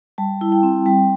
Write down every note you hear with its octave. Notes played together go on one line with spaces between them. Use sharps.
G3 A5
E4
G5
C4
G3 G5